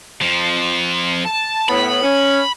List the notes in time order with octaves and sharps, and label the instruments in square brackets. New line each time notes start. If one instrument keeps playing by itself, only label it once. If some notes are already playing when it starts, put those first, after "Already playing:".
[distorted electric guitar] F2 F3
[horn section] A5
[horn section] A2 B3 [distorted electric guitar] B5
[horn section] C#4